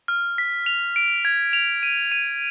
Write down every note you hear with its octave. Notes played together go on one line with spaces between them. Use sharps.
F6
B6
F7
D7
G#6
F7
D#7
D#7